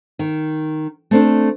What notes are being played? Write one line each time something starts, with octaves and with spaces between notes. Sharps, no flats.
D#3
A3 C4 D4